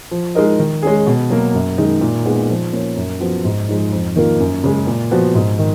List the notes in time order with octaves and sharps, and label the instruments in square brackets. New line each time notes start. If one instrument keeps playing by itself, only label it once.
[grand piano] F3
G#3 D#4 A#4 D#5
D#3
G#3 C#4 G#4
B2
F#3 A#3
F#2
D#3 G#3 D#4
A#2
G#3 B3 D#4 G#4
F3
A#3 C#4
F#2
F3 B3 F#4
G#2
F3 G#3 D#4
F2
D#3 A#3 F4 A#4
F#2
C#3 G#3
A#2
F3 B3 F#4
G#2
D#3